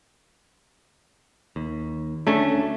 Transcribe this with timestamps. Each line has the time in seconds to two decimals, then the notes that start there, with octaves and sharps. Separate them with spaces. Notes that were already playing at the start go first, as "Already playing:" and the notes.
1.56 D#2
2.27 D2 A3 C#4 D4